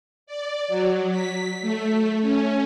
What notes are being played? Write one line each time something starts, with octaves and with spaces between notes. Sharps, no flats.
D5
F#3
B6
A3
C#4